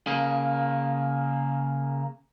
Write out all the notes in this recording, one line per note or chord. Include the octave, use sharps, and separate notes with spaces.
C#3 A#3